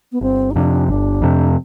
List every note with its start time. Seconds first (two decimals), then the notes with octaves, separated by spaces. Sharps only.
0.12 B3
0.21 G1 C4
0.51 D#4
0.55 F2 C3 D4
0.88 G1 D4
1.22 F2 C3